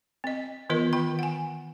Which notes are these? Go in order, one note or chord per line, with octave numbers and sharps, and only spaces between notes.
C4 D#5
D#3 E3 B3 F4 A#4 D#5
D#3 G5 B5
F#5 G#5